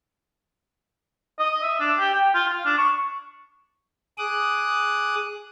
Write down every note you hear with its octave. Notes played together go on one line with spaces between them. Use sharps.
D#5
E5
D4
G4
G5
F4
F5
D4
C#6
G#4 D6 D#6 F#6